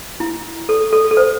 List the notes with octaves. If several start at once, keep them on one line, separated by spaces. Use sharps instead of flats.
E4
A4
A4
A4
C5